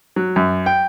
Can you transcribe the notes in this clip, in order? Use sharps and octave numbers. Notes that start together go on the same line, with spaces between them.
F#3
F#2
G5